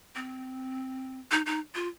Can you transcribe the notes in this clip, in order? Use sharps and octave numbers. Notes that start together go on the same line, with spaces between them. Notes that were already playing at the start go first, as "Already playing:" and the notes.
C4
D#4
D#4
F4